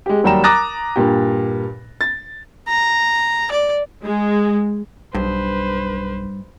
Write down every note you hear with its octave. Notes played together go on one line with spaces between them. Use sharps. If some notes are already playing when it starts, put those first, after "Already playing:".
G#3 G4
D#2 F#3 G3 G5 A#5 E7
A#5 D6 D#6 F#6 A6 A#6
G2 A#2 G4
A6
A#5
D5
G#3
B1 G2 B4 C5